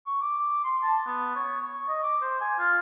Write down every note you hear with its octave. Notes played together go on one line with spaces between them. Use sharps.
C#6
D6
C6
A5
B3
C#5
C#6
D#5
D6
C5
G#5
F4